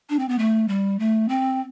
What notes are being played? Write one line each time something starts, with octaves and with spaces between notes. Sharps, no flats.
D4
C4
B3
A3
G3
A3
C4